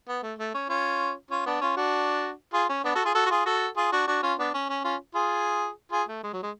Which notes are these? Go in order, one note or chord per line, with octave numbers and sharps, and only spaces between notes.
B3
A3
A3
C#4
C#4 F4
C#4 F4
B3 D4
C#4 F4
D4 F#4
F4 G#4
C#4
B3 D4
F#4 A4
F4 G#4
F#4 A4
F#4
F4 G#4
F#4 A4
F4 G#4
D4 F#4
D4 F#4
C#4 F4
B3 D4
C#4
C#4
C#4 F4
F4 G#4
F4 G#4
A3
G#3
F#3
G#3